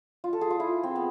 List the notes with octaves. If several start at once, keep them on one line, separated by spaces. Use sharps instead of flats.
F4
A4
G#4
F4
E4
C4
B3